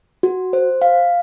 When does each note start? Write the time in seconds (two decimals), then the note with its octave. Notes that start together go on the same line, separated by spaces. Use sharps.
0.23 F#4
0.53 C5
0.82 F5